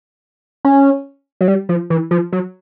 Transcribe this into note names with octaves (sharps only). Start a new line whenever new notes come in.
C#4
F#3
G3
F3
E3
F3
F#3